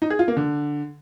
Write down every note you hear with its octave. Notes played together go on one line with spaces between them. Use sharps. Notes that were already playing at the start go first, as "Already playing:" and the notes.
D#4
G#4
F4
A#3
D3